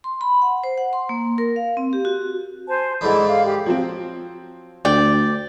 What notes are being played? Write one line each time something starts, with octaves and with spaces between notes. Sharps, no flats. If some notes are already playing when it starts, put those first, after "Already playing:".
C6
B5
F#5
C5
F#5
C6
A#3
A#4
F5
C4
G4
F#4
C5 G#5 A5
G#2 D3 E3 E4 D5
F5
G4
F3 F#3 C4
D2 D5 G5